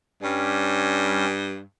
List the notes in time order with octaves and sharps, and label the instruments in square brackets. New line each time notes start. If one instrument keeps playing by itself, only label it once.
[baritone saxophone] G2 [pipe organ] G3 C#4